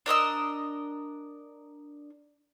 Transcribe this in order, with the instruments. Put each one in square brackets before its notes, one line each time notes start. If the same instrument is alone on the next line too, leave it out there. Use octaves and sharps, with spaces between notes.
[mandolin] D4 A#4 D#5 E6